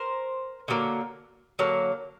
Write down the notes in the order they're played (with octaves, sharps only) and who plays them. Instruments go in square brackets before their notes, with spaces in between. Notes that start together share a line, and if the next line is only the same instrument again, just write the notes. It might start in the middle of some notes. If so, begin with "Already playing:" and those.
Already playing: [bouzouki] A#4 C5
D3 F#3 A#3
D3 F#3 A#3